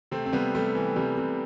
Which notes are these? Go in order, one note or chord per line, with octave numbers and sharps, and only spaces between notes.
C3 A3 C4
C4
C3 G3 B3
G3 A3
E3
C3 G3
C3